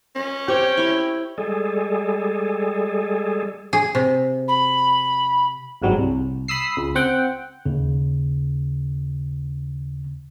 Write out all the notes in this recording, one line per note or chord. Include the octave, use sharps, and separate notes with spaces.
C#4
G4 C5 C#5 G5
E4 C#5
G3 G#3 G#4 A4
G#4
C3
B5
G1 G#2 F#3 G3
C2
B5 D#6 E6 C7
C#2
C4 F#5 G5
D#2 C#3